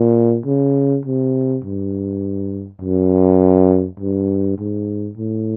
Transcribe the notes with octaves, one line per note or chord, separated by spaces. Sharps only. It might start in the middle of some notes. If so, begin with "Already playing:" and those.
Already playing: A#2
C#3
C3
G2
F#2
G2
G#2
A2